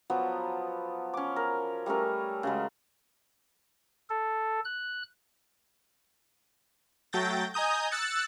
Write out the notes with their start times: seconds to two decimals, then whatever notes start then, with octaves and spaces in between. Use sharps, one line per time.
0.10 F3 F#3 B3
1.14 C#4 D6
1.36 A#4
1.86 G3 A3 C#4 A#4
2.43 C#3 F#3 G#3
4.10 A4
4.65 F#6
7.13 F#3 A3 G5 G6 A6 A#6
7.54 D#5 G#5 A#5 D#6 G6
7.92 E6 F#6 A6 C#7